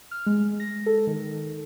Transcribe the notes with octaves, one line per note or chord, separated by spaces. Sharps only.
F6
G#3
A#6
A4
D#3